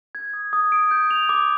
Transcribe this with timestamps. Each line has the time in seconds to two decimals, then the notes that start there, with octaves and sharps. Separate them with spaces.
0.15 G#6
0.33 D#6
0.53 D#6
0.72 D7
0.91 G6
1.11 F7
1.29 D6